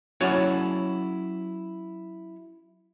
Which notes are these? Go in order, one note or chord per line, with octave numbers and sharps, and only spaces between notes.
F#3 C#4 E4 F#4 C#5 D5